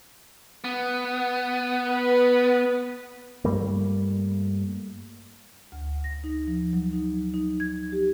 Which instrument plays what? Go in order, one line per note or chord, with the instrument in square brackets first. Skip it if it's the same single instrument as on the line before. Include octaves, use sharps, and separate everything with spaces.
[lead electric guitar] B3
[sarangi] B4
[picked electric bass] G2 G3 A3 A#3
[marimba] D2
A#6
D#4
F3
F#3
D#4
D#4
G#6
G4